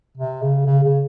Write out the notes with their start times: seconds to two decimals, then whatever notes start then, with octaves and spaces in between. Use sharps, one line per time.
0.18 C3
0.42 C#3
0.66 C#3
0.84 C#3